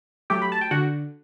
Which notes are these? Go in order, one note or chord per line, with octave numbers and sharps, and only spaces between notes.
F#3 A3 G4 G5
B5
A5
G5
D3 F#4 F#5